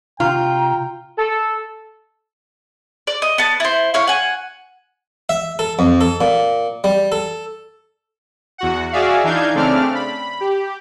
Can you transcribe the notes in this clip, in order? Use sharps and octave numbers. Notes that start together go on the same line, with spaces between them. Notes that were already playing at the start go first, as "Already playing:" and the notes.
C3 F4 G5 A#5
A4
D5
D#5
B3 A5
E4 C5
E4 C#5 F5
F#5 G#5
E5
A4
F2
A4
A#2
G3
A4
E2 F#4 F#5
F#4 G#4 D5 E5 F5
E3 D4 D#4 F5 G6 G#6
C#3 A3 C4 D4 D5 F6
B5
G4